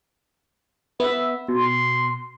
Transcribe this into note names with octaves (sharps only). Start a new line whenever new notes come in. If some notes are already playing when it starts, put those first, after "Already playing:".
B3 E5
B2 C6